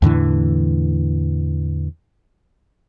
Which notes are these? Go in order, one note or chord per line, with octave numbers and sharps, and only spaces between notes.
E2 A2 D3 E3